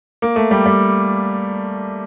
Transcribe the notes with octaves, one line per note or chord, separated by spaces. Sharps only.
A#3
A3
G3
G3